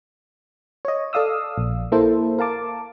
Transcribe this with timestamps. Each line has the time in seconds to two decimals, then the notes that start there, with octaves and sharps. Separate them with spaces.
0.85 C#5 D#5
1.13 A4 D5 F5 D#6 E6
1.58 A#1
1.92 A#3 E4 A4 C5
2.39 A#4 F5 A5 D6